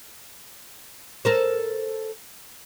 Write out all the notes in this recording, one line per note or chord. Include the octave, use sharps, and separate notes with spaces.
A4 A#4 C5